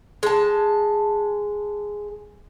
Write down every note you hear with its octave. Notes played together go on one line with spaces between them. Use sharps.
G#3 A5